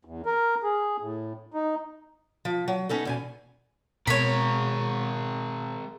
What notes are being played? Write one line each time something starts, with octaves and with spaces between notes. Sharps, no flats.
E2
A#4
G#4
A2
D#4
F3
F#3
B3 C#4 D#4 A4
E2 B2 G#5
B2 G#3 A#4 C#5 B5